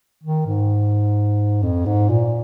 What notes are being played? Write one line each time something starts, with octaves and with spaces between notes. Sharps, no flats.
D#3
G#2
F2
G#2
A#2